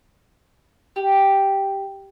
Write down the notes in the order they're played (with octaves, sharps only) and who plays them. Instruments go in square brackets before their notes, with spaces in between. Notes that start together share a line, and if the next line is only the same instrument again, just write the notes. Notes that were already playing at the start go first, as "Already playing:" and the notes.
[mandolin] G4